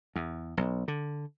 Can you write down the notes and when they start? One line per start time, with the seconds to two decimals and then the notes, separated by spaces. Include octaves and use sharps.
0.16 E2
0.57 B1
0.88 D3